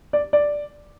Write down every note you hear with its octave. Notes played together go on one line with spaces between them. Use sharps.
D5
D5